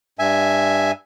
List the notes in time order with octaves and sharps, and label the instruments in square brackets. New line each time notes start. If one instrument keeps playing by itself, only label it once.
[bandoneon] G2 E5 G#5